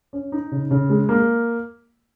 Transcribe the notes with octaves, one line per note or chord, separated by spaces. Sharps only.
C#4
D#4
C#3
C#3
G#3
A#3